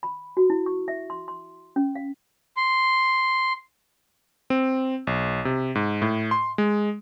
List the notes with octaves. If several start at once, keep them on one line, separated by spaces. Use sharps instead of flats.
B5
F#4
E4
C#6
E5
C6
C6
C#4
F5
C6
C4
B1
C3
G#2
A2
C6
G#3